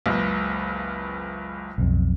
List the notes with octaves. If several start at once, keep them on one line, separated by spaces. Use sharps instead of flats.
F#1 C#2
B1 F2